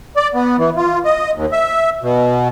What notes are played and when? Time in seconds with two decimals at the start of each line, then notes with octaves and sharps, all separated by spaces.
0.16 D5
0.34 B3
0.58 E3
0.77 F4
1.05 D#5
1.34 D#2
1.52 E5
2.02 B2